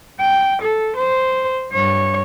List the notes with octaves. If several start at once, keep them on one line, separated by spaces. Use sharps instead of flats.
G5
A4
C5
G2 C#5